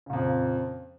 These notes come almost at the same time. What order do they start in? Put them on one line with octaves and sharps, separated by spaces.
C#3 A#2 F2